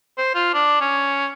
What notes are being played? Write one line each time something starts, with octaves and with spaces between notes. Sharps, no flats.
C5
F4
D4
C#4